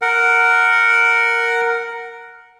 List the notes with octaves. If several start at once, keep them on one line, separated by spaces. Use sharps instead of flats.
A#4 F#5